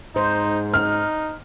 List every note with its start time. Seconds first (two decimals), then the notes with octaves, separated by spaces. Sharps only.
0.16 G#2 D#4 C5
0.74 D#4 F6